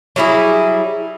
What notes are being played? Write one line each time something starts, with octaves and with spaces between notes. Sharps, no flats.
F#3 G3 E4 G#4